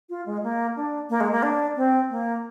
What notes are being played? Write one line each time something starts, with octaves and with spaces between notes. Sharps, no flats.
F4
G#3
A#3
D4
A#3
G#3
A#3
D4
C4
A#3